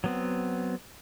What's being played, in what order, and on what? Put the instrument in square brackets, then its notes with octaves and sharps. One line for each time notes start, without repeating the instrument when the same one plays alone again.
[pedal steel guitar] F#3 B3 C4